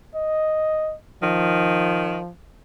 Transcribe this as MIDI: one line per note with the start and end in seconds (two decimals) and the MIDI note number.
0.15 0.95 75
1.23 2.19 51
1.23 2.32 53